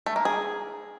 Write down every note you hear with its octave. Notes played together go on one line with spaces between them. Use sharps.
A3
A#3
G#4